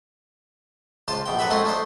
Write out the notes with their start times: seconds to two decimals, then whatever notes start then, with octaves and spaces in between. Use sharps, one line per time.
1.08 C#2 F4 C5 A5
1.26 A#1 B2 G5
1.39 F#2 A4 B4 E5 B5
1.50 G#3 A3 C4 C#4 D#4 F4
1.65 A3 D4 D#4 C5